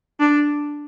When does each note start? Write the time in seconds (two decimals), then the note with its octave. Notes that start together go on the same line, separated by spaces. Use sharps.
0.20 D4